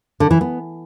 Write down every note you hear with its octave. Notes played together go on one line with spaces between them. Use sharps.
D3
E3
B3